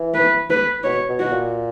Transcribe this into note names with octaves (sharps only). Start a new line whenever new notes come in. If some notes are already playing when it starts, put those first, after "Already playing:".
Already playing: E3
B4
B4
B2 C#5
B2
B2 F#4
A#2